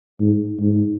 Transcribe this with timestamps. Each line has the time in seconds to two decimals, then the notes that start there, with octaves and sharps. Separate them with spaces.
0.21 G#2
0.60 G#2